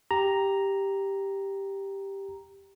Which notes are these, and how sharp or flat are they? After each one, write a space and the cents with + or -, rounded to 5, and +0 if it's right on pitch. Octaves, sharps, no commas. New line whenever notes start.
G4 +0 A#5 +0